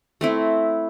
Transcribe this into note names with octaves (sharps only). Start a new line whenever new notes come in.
A3 C4 E4